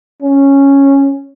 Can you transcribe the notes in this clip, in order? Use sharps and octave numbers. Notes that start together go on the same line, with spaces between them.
C#4